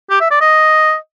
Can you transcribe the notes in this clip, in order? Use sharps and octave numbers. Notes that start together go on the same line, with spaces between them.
G4
E5
D5
D#5